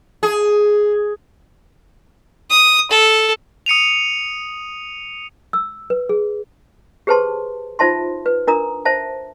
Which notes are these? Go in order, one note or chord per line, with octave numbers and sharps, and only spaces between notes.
G#4
D#6
A4
D#6 C#7 D#7 F7
E6
B4
G#4
G4 G#4 B4 C5 A5 C6
D#4 F4 C5 E5 A5 C6
B4
D4 A#4 A#5 D#6
C5 E5 A5